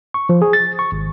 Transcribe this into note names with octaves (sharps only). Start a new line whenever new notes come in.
C#6
F3
G#4
A6
C#6
G#1